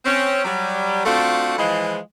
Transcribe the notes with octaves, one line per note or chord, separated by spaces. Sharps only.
C4 C#4
F#3 G3
A3 C4 D4 F4 F#4 A4
E3 F3 G#3